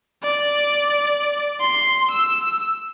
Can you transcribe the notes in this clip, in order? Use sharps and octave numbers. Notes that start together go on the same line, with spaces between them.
D5
C6
E6